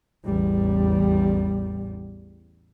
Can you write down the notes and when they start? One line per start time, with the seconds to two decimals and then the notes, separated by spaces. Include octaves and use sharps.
0.25 A1 E2 G3